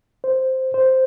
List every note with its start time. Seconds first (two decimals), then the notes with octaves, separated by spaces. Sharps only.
0.24 C5
0.74 C5